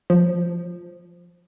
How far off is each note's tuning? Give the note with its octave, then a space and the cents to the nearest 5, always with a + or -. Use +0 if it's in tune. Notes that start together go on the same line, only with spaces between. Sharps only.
F3 +0